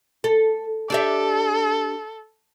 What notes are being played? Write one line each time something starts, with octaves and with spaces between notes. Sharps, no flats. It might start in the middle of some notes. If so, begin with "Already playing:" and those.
A4
D4 G4 A4 E5